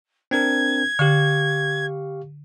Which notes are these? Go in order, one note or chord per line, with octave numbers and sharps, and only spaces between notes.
C4 D4 A#4 G#6
D3 G4 F5 C#6